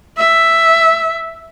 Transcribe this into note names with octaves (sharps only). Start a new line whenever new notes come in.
E5